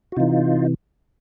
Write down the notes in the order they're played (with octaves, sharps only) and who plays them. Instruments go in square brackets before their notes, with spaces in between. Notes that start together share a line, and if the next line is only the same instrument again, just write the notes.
[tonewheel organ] F#4
C3 E3 D#4 F4